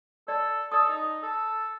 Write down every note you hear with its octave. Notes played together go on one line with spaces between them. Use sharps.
A4 D5
A4 D5 D#6
D#4
A4